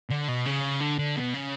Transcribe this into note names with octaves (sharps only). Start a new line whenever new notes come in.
D3
B2
C#3
D3
D3
B2
C#3